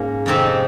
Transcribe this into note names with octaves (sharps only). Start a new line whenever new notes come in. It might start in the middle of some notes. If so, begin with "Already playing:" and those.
Already playing: G#2 A#3 C#4
F2 C3 D#3 C4 D#4